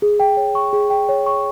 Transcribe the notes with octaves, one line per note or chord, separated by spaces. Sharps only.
G#4
G5
C#5
C#6
G#4
G5
C#5
C#6